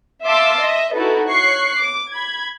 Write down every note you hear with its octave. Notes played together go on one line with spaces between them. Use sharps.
E5 F5 A5 C6 D6 E6
D#5 E5
D#4 E4 F#4 A4 B4
C#5 C#6 F#6 C7
D6
B5 G#6